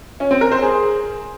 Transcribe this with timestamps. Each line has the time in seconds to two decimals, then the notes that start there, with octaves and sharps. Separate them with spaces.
0.20 C#4
0.31 C4
0.41 A#4
0.52 C5
0.62 G#4